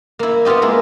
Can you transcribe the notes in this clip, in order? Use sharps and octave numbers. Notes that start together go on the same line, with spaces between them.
A#3 E4
B3 C4 F4 G4 D#5
G#3 A#3 E4